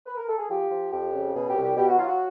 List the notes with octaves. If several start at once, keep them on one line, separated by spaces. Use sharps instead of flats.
B4
A#4
A4
G#4
F3 G4
F3
F2 G4
C#3
B2 G#4
G4
C2
G4
B2 G4
F#4
F#3 F4
F#4